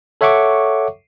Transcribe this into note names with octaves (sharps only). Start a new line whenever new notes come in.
A4 C#5 E5 F#5 C#6 D6